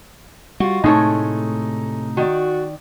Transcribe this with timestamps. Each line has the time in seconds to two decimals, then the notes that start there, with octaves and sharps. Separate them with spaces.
0.60 G3 F4 F#4
0.84 A2 C3 G#3 A3 D#4 C#5
2.17 D#3 F#4 D5